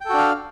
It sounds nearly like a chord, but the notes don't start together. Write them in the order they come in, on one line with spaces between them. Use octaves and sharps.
G5 A4 F#4 D4 F5